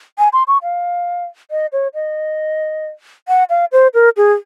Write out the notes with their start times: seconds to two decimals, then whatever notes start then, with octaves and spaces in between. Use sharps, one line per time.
0.18 G#5
0.33 C6
0.48 C#6
0.63 F5
1.51 D#5
1.72 C#5
1.94 D#5
3.28 F#5
3.50 F5
3.72 C5
3.94 A#4
4.17 G#4